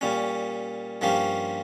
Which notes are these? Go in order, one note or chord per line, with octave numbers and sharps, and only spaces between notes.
A#2 G3 C#4
G2 F3 A#3 C#4 G4